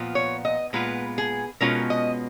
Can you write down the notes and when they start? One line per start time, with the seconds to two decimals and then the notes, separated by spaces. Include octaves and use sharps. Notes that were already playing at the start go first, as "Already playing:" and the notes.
Already playing: A#2 F3 B3 F4
0.15 C#5
0.45 D#5
0.73 A#2 G#3 B3 F4 B4
1.18 G#4
1.61 B2 G#3 C#4 F4 A#4
1.90 D#5